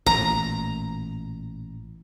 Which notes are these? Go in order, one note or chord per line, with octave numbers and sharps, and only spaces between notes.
A1 A#2 A#5